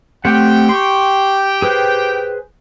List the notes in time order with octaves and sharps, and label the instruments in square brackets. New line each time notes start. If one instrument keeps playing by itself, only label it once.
[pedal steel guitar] A3 C4 F#5 [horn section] G4 G5
[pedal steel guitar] C6 C#6
G#4 B4 C5